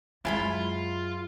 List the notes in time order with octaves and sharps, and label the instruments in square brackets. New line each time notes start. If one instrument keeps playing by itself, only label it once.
[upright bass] F#2 [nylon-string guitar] F#3 G#3 [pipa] E4 G#5 B5 [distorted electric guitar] F4